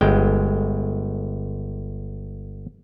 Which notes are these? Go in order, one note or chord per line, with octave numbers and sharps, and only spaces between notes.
G1 G#3 G5